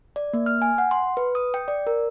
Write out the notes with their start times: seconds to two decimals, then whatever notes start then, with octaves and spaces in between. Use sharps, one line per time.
0.16 D5
0.33 A#3
0.46 F6
0.62 G#5
0.78 F#5
0.91 C6
1.17 B4
1.35 D#6
1.54 G5
1.68 D5
1.87 A#4